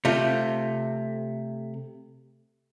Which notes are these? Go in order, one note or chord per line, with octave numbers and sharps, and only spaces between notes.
C3 A3 F4